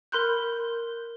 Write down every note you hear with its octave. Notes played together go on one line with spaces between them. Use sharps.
A#4 B5 C6 F#6 G6